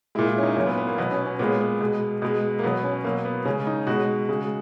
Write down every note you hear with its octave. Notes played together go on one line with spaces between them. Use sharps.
A#2 G#3 E4
E4
C#4
D#4
A#2 F#3 C#4
B3
B3
A#3
B2 F#3 B3
C#4
C#4
A#2 G#3 B3
B3
B2 G#3
B2 G#3
A#3
B2 F#3 B3
C#4
B2 F#3 A#3
B3
C#3 G#3 C#4
D#4
B2 G#3 F#4
C#3 G#3